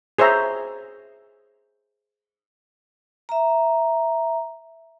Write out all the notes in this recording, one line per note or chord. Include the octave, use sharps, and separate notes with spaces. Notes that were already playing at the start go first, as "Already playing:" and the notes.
G#4 C5 C#5 E5 A#5
E5 A#5